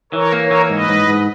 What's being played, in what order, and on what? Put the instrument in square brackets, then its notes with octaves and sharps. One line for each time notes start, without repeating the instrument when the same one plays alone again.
[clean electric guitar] E3 [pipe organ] A#4 C#5
[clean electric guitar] A#3
[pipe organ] A#4 C#5
[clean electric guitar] E3
[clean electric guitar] G#2 [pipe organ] B4 D#5
[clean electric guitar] G#2
G#2